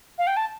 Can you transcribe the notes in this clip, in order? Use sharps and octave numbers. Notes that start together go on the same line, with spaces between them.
F5
G5
A5